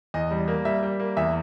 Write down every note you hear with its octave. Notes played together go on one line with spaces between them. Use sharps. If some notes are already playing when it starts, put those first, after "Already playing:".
E2 D#5
G3
A#3
G3 E5
G3
A#3
E2 E5